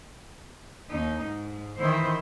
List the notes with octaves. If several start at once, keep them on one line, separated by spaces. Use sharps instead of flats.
D#2 D#4
G#2
D#3 E3 E4 C5